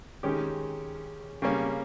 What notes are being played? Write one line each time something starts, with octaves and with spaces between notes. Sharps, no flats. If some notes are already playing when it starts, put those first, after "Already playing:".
D#3 G#3 C#4 G4
C#3 G3 A#3 C#4